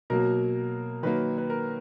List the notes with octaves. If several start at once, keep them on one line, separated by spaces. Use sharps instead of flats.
B2 F#3 A#3 A#4
D#3 F#3 A#3 B4
B4
A#4